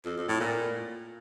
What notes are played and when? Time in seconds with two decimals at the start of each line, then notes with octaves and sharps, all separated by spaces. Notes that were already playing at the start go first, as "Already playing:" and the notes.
0.05 F2
0.17 F2
0.28 A2
0.40 A#2